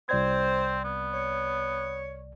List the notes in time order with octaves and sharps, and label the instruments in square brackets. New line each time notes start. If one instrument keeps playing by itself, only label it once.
[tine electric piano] C2 D5 G#6 [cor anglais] C4 [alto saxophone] C5
[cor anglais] B3
[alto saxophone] C#5